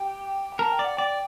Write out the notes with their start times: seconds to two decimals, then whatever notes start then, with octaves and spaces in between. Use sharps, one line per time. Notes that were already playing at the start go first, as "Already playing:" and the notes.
Already playing: G4 G5
0.59 A#4 A5
0.72 G5
0.79 D5
0.84 F#5
0.97 D5 G5